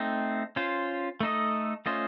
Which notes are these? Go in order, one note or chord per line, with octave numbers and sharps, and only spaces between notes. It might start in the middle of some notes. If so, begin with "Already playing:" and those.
Already playing: A3 C4 D#4
C#4 F4 C5
A3 D#4 A4 D#5
A3 C#4 F4 C5 D#5